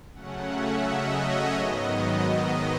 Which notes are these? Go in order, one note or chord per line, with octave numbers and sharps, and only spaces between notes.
C#3 F#3 A3 C#4 F#5
E5
D#5
C#5
G#2 D#3 F#3 B3 D#5
D#5